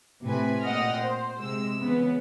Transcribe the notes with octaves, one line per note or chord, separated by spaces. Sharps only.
A2 C3 B4 G#5
A#2 D#5 F#5 G5 F6 A#6
C5
C3 G#3 E6
C#3 E3 B3 B4